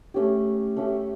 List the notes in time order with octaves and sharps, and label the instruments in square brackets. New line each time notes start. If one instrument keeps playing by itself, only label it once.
[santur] A3 C#4 G4
A3 C#4 G4